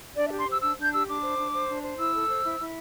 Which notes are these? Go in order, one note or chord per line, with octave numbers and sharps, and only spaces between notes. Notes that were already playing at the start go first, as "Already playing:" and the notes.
D4 D5
E5
G4
C6
C5 E6
D4 E6
D4
G6
G4 E6
D4 D6
C5
D4
C5
D4
C5
E4 E6
A4
C5
E4
E4